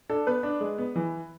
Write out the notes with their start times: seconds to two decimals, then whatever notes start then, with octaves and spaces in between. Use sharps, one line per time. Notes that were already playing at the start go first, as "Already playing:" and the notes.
0.09 D4 A4
0.27 B3 B4
0.43 D4
0.61 G#3
0.78 B3
0.96 E3